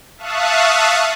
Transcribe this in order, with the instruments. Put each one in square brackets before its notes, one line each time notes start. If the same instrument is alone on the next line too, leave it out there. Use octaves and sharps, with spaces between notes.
[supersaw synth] E5 F5 A5 C#6 D#6 F#6